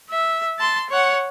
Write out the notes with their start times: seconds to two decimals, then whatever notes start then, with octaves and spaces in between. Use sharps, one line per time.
0.10 E5
0.59 A5 C6
0.90 C#5 F#5